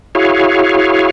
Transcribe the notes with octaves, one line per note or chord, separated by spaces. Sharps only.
E4 F#4 G#4 C#5 F5